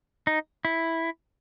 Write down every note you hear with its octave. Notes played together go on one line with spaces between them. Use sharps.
D#4
E4